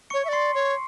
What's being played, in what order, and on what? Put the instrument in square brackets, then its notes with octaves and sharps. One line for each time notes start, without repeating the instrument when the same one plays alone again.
[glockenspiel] C#6 C#7
[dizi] C#5
E5
[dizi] D5 [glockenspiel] C6 C7
[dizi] C#5